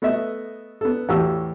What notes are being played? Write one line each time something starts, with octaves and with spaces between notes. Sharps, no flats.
A3 B3 A4 D#5 E5
B3 A4
E2 A2 F#4 G4 A5 E6